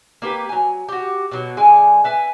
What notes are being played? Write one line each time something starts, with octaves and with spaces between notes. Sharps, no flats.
A#3 G4 B4 G5
F#3 G#5
F#4 G4
B2 F#3
D3 G#3 G#5
B4 E5 G#5